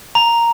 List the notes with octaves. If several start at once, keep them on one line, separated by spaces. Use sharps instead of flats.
A#5